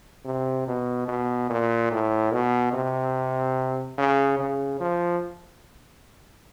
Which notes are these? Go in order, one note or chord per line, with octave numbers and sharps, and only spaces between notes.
C3
B2
B2
A#2
A2
B2
C3
C#3
C#3
F3